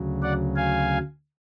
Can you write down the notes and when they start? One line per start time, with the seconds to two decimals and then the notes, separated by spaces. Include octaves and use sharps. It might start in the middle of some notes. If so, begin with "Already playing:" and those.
Already playing: D2 C#3 F#3
0.23 D5 F#5
0.56 F5 G#5